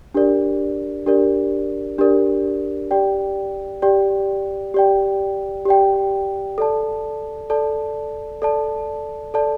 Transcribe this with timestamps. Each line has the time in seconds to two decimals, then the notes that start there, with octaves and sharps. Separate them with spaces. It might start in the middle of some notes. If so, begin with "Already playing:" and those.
0.14 D4 G4 A#4 D5
1.06 D4 G4 A#4 D5
1.98 D4 G4 A#4 D5
2.91 G4 D5 G5
3.82 G4 D5 G5
4.74 G4 D5 G5
5.66 G4 D5 G5
6.58 A4 D5 A5
7.50 A4 D5 A5
8.42 A4 D5 A5
9.34 A4 D5 A5